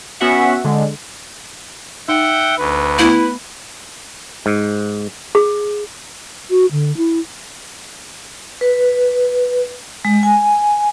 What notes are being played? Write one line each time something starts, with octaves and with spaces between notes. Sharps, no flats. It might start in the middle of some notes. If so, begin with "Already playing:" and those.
B3 C#4 F#4 E5 F#5
D3 G#3
D#4 E5 F#5 G5
D2 B4
A3 B3 E4
G#2
G#4
F#4
D3
E4
B4
G#3
G#5